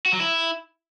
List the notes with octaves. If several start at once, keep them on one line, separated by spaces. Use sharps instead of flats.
F#4
F#3
E4